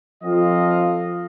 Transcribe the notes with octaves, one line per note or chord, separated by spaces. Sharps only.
F3 C4 F4 A4 D#5 F5